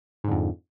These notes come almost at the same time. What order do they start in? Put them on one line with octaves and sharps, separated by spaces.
G#2 D3 F2